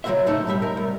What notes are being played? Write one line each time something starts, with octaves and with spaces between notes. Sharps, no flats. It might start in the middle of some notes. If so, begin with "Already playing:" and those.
C#3 F#3 G3 F#4 C5 E5
A2 A3 D#4 A4
B2 G3 E5
A#4
C2